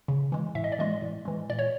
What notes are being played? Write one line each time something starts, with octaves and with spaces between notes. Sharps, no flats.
C#3
E3 G#3
A2 E5
D#5
D5
E3 G#3 D#5
A2
E3 G#3
A#2 D5
C#5